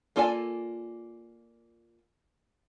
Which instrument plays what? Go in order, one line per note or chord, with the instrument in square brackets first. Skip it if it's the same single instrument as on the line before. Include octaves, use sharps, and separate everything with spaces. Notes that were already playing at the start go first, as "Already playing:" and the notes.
[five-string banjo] A#3 F4 A4 D5 G#5